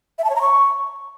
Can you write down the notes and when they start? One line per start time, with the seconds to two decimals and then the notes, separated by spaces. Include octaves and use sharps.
0.18 E5
0.24 A5
0.30 C#5
0.36 A#5
0.41 C#6